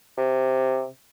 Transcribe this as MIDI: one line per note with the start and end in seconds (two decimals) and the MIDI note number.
0.18 0.87 48